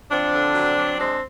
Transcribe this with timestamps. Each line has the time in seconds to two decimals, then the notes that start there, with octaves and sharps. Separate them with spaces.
0.11 F3 C4 D4
0.33 D3
0.55 F#3
0.77 F#3
0.98 G#3 C4 D4